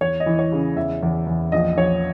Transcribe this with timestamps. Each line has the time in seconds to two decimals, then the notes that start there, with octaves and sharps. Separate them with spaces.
0.01 E2 C#5
0.20 D#5
0.26 E3
0.39 C#5
0.52 C#3
0.76 E2 E5
1.03 E2
1.27 E2
1.52 A#1 D#5
1.77 A#1 C#5